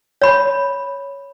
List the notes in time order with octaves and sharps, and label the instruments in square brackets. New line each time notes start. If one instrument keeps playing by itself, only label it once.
[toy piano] C#5 B5